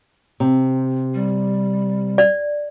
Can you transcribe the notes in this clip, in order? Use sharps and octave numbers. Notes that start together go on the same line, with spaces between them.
C3
G3
D5